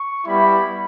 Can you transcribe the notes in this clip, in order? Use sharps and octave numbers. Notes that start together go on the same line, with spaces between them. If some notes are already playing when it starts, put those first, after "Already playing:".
Already playing: C#6
G3 B3 E4 B5